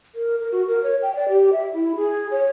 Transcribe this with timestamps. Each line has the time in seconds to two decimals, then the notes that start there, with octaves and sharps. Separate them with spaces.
0.15 A#4
0.40 A#4
0.52 F#4
0.68 A#4
0.83 C#5
1.02 G5
1.15 D5
1.29 G4
1.53 E5
1.74 E4
1.96 G#4
2.31 C#5